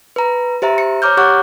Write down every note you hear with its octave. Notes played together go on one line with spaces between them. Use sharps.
B4 A#5
G4 C5 E5 A#5
C#7
C#5 A#5 D6 F6 G6
G4 C#5 F#5 C#6 D6 F#6